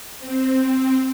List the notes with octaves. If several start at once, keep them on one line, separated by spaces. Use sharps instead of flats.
C4